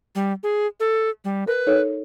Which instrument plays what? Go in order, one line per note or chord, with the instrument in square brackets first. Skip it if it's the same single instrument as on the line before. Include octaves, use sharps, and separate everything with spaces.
[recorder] G3
G#4
A4
G3
[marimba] A#4 [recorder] B4
[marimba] D#4 A4 C#5